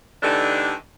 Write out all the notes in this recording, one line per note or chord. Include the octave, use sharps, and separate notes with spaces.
D3 E3 A3 D4 D#4 G4